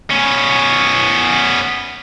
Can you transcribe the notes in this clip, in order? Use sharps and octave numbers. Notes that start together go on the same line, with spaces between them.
B3 C#4